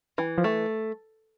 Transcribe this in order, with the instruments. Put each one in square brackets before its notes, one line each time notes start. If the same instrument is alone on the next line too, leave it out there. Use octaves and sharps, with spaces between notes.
[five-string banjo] E3
[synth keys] F3
[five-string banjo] A3